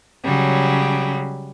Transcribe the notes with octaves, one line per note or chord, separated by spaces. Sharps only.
C#3 F#3 G3